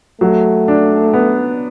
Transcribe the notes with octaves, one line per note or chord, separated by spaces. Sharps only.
F#3 A3
D4
B3